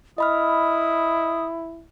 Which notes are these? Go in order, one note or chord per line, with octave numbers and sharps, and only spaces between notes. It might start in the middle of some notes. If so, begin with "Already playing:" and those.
E4 D#5 B5 D#6 F6